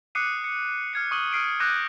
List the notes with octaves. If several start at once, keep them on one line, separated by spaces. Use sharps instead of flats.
D6 D#6 F#6 C7 C#7 D#7
C#7
F6 G#6 C#7
C#6 D#6 D#7 F#7 G7
D#6 F6 C7 D7 D#7
D6 D#6 F#6 G6 A#6 D#7